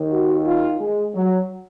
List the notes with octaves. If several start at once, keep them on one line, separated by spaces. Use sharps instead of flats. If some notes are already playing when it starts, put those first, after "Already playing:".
Already playing: D#2 D#3
F#4
F4
G#3
F#3